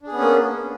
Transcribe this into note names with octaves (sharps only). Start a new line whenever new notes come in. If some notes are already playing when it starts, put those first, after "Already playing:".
A#3 B3 C#4 D4 G#4